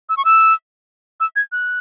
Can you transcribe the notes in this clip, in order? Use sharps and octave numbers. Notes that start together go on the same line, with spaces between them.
E6
C#6
E6
E6
G#6
F#6